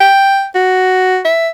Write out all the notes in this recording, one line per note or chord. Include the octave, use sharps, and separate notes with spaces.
G5
F#4
E5